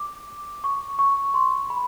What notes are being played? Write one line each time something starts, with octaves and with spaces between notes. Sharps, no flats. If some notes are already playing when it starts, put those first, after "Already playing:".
Already playing: D6
C#6
C#6
C6
B5